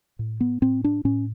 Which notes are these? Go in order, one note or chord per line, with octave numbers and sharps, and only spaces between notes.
A2
B3
A2 C4
D4
A2 C#4